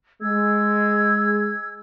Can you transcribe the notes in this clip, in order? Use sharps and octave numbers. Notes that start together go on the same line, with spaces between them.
G#3 E6 G#6